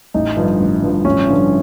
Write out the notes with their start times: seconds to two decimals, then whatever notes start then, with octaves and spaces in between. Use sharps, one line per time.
0.14 A1 D#4
0.36 G2 D3 F3
0.60 A1
0.82 G2 D3 F3
1.05 A1 C#4
1.28 G2 D3 F3